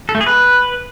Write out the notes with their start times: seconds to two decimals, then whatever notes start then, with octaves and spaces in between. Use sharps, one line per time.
0.09 A4
0.15 A3
0.21 G#4
0.26 B4